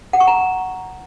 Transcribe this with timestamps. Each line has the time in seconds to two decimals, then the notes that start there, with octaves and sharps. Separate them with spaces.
0.13 F#5
0.20 C#6
0.27 A#5